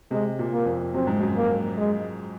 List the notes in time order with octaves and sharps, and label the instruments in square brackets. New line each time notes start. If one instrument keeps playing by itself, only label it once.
[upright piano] C3 [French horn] G#3
[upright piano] A#2
[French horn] A#3
[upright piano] F2
[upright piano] F#2 [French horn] C4
[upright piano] G#2
F#2
[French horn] A#3
G#3